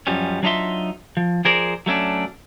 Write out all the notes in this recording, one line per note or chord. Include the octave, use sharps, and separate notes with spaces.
F#2 F3 G3 C#4
F#3 D4 D#4 F4 E5 C6
F3
F3 G#4 A#4 C5 D5
F#3 A3 C#4 D4